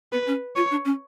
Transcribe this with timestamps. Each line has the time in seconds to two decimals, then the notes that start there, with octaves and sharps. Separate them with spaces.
0.12 B3 B4
0.26 C#4
0.56 F4 C#5
0.70 D4
0.85 C#4